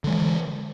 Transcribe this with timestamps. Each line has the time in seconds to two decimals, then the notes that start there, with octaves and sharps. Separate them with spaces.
0.04 D3
0.07 G#3
0.10 E3